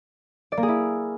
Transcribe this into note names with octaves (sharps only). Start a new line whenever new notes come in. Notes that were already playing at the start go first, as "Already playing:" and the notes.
D5
A#3
G#4
E4